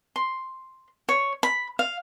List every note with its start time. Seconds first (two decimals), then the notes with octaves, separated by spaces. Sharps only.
0.16 C6
1.09 C#5
1.43 B5
1.79 F5